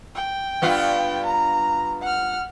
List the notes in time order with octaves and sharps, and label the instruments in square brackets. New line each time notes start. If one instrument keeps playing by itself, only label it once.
[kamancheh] G5
[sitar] G2 B3 F4
[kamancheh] A#5
F#5 F6